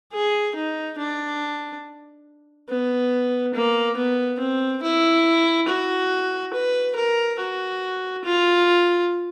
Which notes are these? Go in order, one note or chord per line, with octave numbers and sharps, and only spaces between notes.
G#4
D#4
D4
B3
A#3
B3
C4
E4
F#4
B4
A#4
F#4
F4